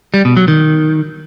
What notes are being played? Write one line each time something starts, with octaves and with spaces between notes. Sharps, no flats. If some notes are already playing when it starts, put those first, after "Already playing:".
G3
B2
F#3
D#3